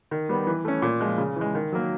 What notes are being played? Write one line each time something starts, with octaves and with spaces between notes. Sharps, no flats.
D#3
G3 B3
E3
A3 C#4
A#2
F3 G#3
C#3
E3 G#3
D#3
F#3 A#3